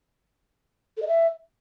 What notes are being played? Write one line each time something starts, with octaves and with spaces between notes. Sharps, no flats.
A4
D#5
E5